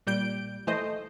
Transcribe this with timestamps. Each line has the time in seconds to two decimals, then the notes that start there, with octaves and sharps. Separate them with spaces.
0.07 A#2 G3 G6 D7
0.67 E3 A3 C5 D#5